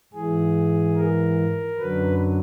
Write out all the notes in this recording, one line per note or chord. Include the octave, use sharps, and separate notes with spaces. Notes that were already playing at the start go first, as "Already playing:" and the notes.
G#2 E3 G#4
A#4
F#2 D3 F#3 B4